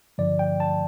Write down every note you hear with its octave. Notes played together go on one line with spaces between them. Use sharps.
G2 D3 F3 D5
G5
A5